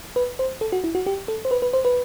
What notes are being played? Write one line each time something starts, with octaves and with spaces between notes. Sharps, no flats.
B4
C5
A4
F#4
E4
F#4
G4
A4
C5
B4
B4
C5
B4